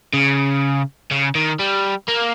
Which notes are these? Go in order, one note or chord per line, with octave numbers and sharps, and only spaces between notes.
C#3
C#3
D#3
G3
A#3